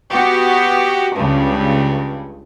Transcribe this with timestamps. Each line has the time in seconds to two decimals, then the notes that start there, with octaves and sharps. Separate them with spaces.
0.11 B3 F#4 G4
1.16 C#2 G2 C#3